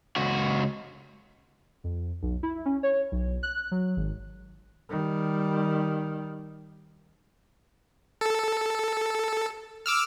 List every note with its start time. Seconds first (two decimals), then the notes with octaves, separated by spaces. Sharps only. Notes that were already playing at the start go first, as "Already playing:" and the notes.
0.16 C#2 F#4
1.84 F2
2.22 B1
2.43 E4
2.66 C#4
2.83 C#5
3.12 B1
3.43 F#6
3.71 F#3
3.96 G#1
4.89 D#3 G3
8.21 A4
9.86 D6 E6 F6